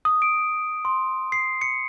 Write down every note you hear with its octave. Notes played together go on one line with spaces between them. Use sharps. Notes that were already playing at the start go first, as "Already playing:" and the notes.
D#6
D7
C6
C7
C#7